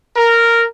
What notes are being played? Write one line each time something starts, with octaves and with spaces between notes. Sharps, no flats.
A#4